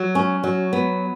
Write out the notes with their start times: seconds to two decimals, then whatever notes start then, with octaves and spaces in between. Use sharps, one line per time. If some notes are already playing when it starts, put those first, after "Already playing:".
Already playing: F#3
0.15 C#4
0.44 F#3
0.73 B3